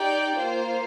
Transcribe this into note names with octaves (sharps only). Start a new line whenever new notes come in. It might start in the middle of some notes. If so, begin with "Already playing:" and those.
Already playing: D#4 G4 D5 G5
A#3 F4 C5